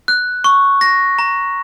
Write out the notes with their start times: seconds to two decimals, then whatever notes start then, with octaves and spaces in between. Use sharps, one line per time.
0.08 F#6
0.44 C#6
0.81 A#6
1.19 A#5